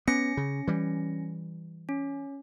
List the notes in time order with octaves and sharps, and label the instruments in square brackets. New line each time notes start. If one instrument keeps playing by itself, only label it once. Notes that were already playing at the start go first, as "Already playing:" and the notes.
[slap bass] B3 [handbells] C#4 A#6 C#7
[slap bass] C#3
E3 G3
[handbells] C#4